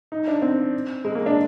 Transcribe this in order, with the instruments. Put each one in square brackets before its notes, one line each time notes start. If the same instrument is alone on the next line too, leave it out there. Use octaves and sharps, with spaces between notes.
[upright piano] D#4
D4
C4
G#3
A#3
D4